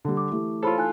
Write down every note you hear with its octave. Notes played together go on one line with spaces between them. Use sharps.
D3 G3
D6
E3 A3 G4
F4 A4 C5 C#5 B5
D#4 G#5 F#6